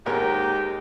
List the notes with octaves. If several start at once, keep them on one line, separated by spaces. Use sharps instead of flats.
D#2 G#2 D#4 G4 A#4